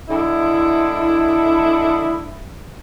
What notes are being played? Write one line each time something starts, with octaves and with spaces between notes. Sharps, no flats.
D3 G#3 E4